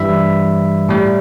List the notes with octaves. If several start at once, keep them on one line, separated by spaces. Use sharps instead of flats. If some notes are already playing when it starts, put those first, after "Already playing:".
Already playing: G2 E3 G3 E5 B5
A2 G3